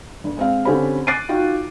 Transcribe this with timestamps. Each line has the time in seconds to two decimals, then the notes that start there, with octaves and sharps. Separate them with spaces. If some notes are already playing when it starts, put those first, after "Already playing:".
0.24 G1
0.37 G#3 C4 F5
0.65 D3 C4 C#4 G4 C5 B5
1.07 D6 F#6 A6 C7 D7 D#7
1.29 D#4 F4 F#4 G5